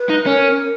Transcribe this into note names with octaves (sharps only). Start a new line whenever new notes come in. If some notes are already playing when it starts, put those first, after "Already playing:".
Already playing: B4
D#4
C#4 A#4